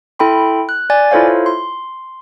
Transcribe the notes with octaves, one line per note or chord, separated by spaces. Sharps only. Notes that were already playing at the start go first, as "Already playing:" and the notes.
E4 A4 G5 B5 C6
F#6
D5 G#5 A6
E4 F4 A4 C5 C#5 F5
C6